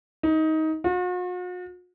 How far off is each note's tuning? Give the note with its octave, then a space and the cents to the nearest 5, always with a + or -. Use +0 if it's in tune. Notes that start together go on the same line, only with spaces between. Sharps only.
D#4 +20
F#4 -45